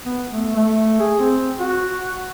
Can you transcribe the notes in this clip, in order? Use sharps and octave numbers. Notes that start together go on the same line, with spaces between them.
B3
A3
A3
G#4
C4
F#4